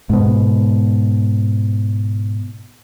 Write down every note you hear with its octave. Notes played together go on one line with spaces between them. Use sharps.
G#2 B2